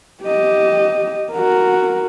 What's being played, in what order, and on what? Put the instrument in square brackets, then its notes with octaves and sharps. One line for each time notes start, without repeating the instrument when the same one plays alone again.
[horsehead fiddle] G4 D#5
F#4 A#4